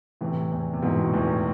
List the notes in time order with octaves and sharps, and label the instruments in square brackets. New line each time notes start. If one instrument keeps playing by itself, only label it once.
[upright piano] A2 C3 [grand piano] E3
[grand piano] E2
[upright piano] C3
[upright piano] G#2 B2 [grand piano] E3
[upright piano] A2
B2
[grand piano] E2 [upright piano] A2 C3